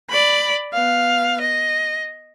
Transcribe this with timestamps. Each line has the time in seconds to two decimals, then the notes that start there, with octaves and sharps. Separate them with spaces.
0.11 D5 B5
0.73 B3 F5
1.41 D#5